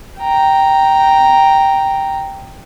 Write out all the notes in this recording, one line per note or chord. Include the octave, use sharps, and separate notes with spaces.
G5 A#5